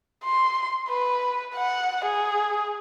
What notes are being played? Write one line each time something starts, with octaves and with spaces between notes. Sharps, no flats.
C6
B4
F#5
G#4